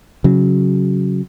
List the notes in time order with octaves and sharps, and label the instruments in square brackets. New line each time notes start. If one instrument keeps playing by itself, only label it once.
[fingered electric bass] C#3 F#3